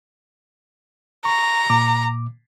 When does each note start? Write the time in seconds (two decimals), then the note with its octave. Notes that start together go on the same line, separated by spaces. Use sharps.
1.25 A#5 C#6
1.70 A#2 D6